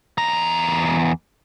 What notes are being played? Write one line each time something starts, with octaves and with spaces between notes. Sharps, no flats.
E2 A#5